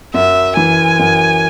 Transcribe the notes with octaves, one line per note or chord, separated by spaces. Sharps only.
F#2 E5
E3 G#5
F#2